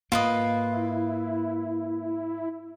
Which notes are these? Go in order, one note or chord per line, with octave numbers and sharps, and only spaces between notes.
G#2 A#3 F4 B4 D#5
E4